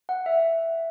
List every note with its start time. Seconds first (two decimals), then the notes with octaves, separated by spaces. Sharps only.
0.09 F#5
0.26 E5